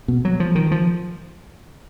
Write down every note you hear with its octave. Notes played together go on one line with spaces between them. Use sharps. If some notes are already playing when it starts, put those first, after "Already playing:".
B2
F#3
F3
D#3
F3